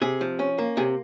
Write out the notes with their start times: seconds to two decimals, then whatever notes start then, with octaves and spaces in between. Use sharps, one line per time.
0.02 C3 G#4
0.21 F3
0.39 C#4
0.58 A#3
0.77 C3 G#4